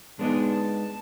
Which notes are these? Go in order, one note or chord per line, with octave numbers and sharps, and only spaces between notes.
G#3 B3 D4 D#4 G#4
A5